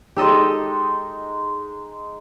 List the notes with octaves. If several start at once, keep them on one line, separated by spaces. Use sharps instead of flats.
G#3 D#4 G4 A4 D#5